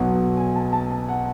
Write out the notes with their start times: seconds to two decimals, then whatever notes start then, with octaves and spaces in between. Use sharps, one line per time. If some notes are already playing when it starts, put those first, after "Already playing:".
Already playing: B1 B2 F#3 F#5
0.37 G#5
0.56 A5
0.73 A5
0.91 A5
1.08 F#5